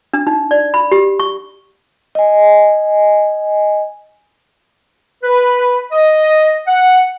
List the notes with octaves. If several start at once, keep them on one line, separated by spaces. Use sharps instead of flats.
D4
D#4
D5
B5
G4
C#6
D#5 G#5
B4
D#5
F#5